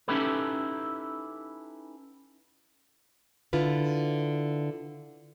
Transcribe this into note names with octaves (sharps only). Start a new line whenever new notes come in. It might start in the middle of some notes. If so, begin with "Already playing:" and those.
C#4 D#4 E4 G4 A4 B4
D3 E4 F4 B4